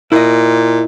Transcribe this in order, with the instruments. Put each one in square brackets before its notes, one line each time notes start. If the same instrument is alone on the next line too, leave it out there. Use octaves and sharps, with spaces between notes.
[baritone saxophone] A#2 [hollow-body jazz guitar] E4 D#5